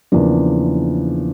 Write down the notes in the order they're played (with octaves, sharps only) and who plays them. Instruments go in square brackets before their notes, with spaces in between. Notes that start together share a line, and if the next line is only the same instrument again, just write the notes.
[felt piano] E2 C#3 F3 A#3 D4